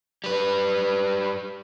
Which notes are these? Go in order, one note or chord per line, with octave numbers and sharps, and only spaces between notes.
G3 B4